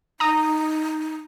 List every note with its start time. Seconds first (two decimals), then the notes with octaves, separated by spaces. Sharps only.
0.20 D#4 A#5 D#6